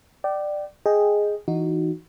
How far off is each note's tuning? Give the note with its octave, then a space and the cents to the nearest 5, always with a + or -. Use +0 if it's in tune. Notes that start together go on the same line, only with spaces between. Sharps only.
D5 +15 G5 -30
G#4 +0 D#5 +0 G5 +0
E3 +0 D#4 +0 F#4 +0